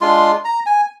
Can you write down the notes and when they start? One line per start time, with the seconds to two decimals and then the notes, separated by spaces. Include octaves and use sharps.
0.01 G#3 D4 F4 C6
0.45 A#5
0.66 G#5